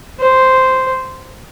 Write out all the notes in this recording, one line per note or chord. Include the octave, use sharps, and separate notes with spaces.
C5